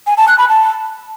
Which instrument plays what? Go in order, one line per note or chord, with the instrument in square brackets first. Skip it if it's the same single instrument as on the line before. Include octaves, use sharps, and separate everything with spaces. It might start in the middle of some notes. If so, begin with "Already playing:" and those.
[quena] G#5
A5
F#6
B5
A5